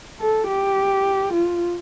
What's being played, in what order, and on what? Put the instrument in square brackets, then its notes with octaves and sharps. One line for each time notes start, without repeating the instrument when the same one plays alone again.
[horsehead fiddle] A4
G4
F4